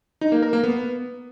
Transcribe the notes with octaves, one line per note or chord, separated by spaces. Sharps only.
D#4
A#3
A#4
A#3
B3